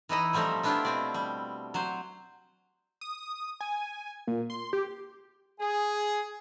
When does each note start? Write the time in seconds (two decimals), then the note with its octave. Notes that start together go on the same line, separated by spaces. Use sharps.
0.09 E3 D#4 E4 D#5
0.33 F3 G3 A3 C4 D#4
0.63 A3 B3 D4 E4 F4 G4
0.85 B2 C4 D5
1.14 G3
1.74 F#3 C5
3.01 D#6
3.61 G#5
4.27 A#2
4.50 C6
4.73 G4
5.60 G#4